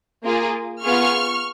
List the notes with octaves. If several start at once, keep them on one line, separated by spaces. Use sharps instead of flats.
A#3 F4 G#4
B3 F4 G#4 C#6 F6